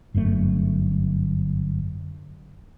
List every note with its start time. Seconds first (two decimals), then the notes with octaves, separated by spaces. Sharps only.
0.14 G1 F#2 A#2 A3